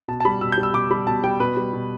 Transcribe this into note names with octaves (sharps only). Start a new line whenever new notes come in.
B2 A5
A5
G3 B5
B2 E6
G6
G3
E6
B2 D6
G3 B5
B2 A5
G3 G5
B2 B4
G3
B2